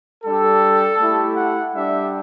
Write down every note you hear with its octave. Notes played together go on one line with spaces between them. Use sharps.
G3 D4 G4 A4
A3 E4 G4
F#5
G3 D4 G4 E5